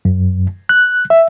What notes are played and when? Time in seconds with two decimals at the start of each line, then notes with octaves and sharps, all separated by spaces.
0.05 F#2
0.69 F#6
1.10 E5